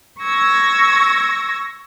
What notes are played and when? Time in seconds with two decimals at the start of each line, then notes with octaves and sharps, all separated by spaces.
0.20 C#6 E6 G#6 A#6